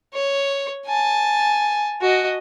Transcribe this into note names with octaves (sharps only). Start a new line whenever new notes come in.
C#5
G#5 A5
F#4 D#5